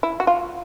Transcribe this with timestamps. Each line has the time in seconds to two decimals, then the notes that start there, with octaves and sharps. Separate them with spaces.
0.03 E4
0.20 F#4
0.27 F4